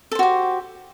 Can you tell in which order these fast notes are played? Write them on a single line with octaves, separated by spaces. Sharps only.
A4 C5 F#4 G4